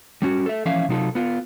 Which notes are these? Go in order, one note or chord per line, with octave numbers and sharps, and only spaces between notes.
G3 C#4 F#4
A4 E5
E3 F3 C#4 E5 F5
C3 F#3 D#4 F4 A4
B3 F4